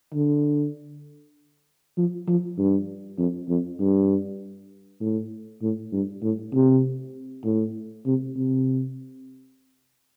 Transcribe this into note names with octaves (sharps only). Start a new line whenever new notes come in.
D3
F3
F3
G2
F2
F2
G2
A2
A2
G2
A2
C3
A2
C3
C3